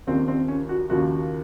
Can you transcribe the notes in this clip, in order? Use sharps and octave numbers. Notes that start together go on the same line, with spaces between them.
D#2 C#3 F3 A#3 C4
C4
C#4
F#4
D#2 C#3 F3 A#3 F#4